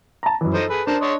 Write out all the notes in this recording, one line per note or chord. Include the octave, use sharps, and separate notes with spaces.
A5 A#5
F#2 E3
F3 D#4 A4 C5
G#4 B4
D4 A#4 C5 A5
C#5 D#5 C6